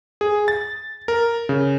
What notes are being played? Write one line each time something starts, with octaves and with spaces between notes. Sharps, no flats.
G#4
A6
A#4
C#3